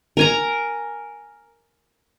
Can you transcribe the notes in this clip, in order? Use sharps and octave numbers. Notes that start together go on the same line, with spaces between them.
A#4 G#5 A#5